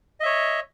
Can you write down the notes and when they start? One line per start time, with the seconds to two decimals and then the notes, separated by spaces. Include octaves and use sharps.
0.20 D#5
0.23 E5
0.25 C#5